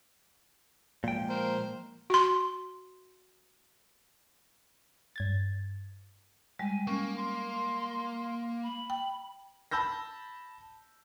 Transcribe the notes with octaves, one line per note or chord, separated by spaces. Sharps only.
A#2 F3 G#3 A#3 G5
A#4 C5
F#4 C6
G2 G#6 A6
G3 G#3 G#5
A#3 C#4 C#6
C6
B5
G5
A5 B5 E6 G6 A#6